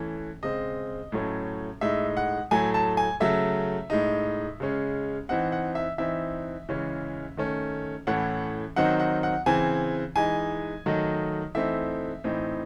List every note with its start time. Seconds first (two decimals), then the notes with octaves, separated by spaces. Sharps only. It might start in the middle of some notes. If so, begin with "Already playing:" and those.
Already playing: E3 A3 C#4
0.43 C#3 G#3 C4 D#5
1.12 A2 F#3 A3 C#4
1.81 A2 G#3 D#4 E5
2.17 F#5
2.51 A2 F#3 A3 G#5
2.74 A5
2.97 G#5
3.20 C#3 F#3 A3 E5
3.90 A2 G#3 D#4
4.60 C#3 G#3 C#4
5.29 E3 C4 D#4 F#5
5.52 F#5
5.75 E5
5.98 E3 C4 D#4 E5
6.69 C#3 E3 G#3 C#4
7.37 D#3 A3 C#4
8.07 A2 E3 A3 C#4 F#5
8.76 D#3 F#3 C4 D#4 F#5
9.00 F#5
9.23 F#5
9.46 C#3 E3 C4 G#5
10.16 E3 G#3 D#4 G#5
10.86 D#3 F#3 A3 D#4
11.55 E3 A3 C4 D#4 E5
12.24 A2 E3 C4 D#4